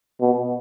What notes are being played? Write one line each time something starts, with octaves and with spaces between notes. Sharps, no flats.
B2